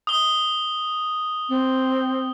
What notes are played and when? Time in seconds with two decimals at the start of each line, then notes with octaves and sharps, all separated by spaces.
0.07 D#6 G7
1.49 C4